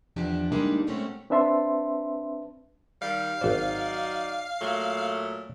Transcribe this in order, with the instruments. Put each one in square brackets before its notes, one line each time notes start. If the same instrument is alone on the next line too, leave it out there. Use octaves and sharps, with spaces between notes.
[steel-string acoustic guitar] E2 D#3 F3 D4 E4 G4
D2 G3 G#3 A#3 D4 D#4
A#2 G#3 A3 C4 C#4 F#4
[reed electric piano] C4 D4 B4 E5 A5 C6
[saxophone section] D#3 G3 [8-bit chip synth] F5
[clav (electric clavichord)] G#1 C5 [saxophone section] F#3 D#4 D5
[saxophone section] A#2 F#3 A3